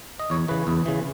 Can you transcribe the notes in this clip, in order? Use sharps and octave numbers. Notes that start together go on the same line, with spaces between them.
D#5
E2 C#5
C#3 E3 B4
E2
C#3 E3